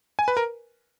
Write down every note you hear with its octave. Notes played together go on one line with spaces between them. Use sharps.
G#5
B4
A#4